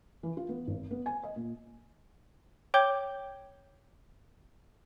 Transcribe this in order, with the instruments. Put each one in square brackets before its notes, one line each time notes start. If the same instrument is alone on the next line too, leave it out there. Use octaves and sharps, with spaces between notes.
[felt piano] E3
F4
B3
G#1
B3
G#5
D#5
A#2
[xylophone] C#5 G5 D6 G6 G7